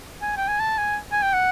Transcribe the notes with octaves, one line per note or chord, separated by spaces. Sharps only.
G#5
G5
G#5
A5
G#5
G#5
G5
F#5